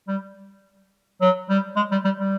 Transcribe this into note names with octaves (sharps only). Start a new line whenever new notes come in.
G3
F#3
G3
G#3
G3
G3
G3